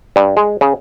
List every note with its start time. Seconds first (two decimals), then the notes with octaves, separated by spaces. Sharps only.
0.16 G2
0.37 G#3
0.61 C#3